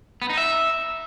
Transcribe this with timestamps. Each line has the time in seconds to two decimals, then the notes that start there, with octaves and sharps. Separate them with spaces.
0.22 B3
0.29 D#4
0.37 E5